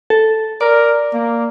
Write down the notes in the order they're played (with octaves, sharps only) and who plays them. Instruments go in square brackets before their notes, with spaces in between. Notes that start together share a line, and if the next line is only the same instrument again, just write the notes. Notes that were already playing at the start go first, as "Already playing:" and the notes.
[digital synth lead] A4
[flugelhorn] A#4 [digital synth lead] D5
[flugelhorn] A#3